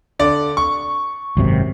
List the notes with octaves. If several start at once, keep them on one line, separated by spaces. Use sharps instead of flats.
D3 D5
C#6
G#1 F#2 C3